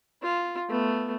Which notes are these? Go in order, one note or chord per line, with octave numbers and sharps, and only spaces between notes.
F4
A3 B3